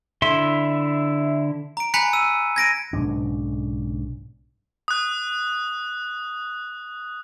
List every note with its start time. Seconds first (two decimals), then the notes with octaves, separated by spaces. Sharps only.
0.22 D3 E4 E5 C6
1.77 A#5 D7
1.94 G#5 A#5 B5 F#6 B6 C#7
2.13 E6 D#7
2.56 G#6 A#6 D7 D#7
2.93 B1 G#2 C#3 D4
4.88 D#6 F#6